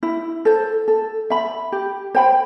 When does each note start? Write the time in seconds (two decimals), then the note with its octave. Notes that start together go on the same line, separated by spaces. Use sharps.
0.03 E4
0.45 A4 C5
0.88 A4
1.30 E5 B5
1.72 G4
2.15 C5 G5 B5